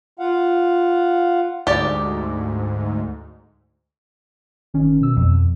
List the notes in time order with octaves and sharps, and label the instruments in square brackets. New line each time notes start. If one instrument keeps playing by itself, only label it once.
[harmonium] F4 F5 F#5
[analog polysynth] D2 G#2 [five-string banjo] G4 D5
[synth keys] G1 D#3 C#4
B2 E6
[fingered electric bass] F2